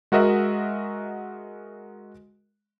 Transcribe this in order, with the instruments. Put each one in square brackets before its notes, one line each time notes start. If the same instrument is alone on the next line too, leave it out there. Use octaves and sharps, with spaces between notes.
[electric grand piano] G#3 F#4 A#4 D#5 E5 F#5